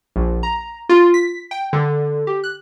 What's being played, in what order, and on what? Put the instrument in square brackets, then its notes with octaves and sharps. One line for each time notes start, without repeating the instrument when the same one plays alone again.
[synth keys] A#1
A#5
F4
B6
G5
D3
G4
F#6